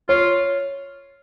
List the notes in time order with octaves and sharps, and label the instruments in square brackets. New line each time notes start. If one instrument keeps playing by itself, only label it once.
[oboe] F4 [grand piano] C#5